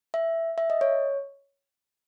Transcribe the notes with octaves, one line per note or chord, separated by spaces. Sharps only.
E5
E5
D#5
C#5